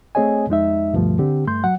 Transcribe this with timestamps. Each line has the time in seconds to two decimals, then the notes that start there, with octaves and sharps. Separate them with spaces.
0.15 A3 C4 G#4 C#5 D#5 G#5
0.49 F2 G#3 D#4 E5
0.93 D2 G2 B2 F3 A3
1.19 D3 C4 G4
1.47 G2 A3 C6 G6
1.64 F#3 F#5